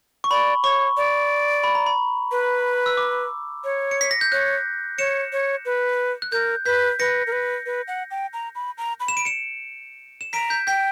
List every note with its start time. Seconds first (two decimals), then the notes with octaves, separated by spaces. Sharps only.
0.24 C#6
0.31 D5 B5
0.63 C#5 C#6
0.97 D5
1.64 B5
1.75 A#5
1.86 B5
2.31 B4
2.86 E6
2.97 D6
3.64 C#5
3.91 C#7
4.01 B6
4.11 A#6
4.21 G6
4.32 C#5 F#6
4.99 C#5 C#7 E7
5.32 C#5
5.65 B4
6.22 F#6
6.32 A#4 G6
6.65 B4 G6 B6
6.99 B4 A#6 C#7
7.27 A#4
7.32 B4
7.66 B4
7.88 F#5
8.11 G5
8.33 A#5
8.55 B5
8.78 A#5
9.00 B5
9.08 E7
9.17 D7
9.25 C#7 E7
10.21 E7
10.33 A#5 B6 D7
10.50 G6 B6
10.67 G5 G6 B6